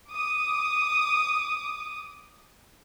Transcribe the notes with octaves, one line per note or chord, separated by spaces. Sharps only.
D6 D#6